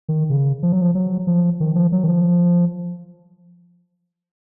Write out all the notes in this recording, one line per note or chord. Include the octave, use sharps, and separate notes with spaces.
D#3
C#3
F3
F#3
F3
F#3
F3
D#3
F3
F#3
D#3
F3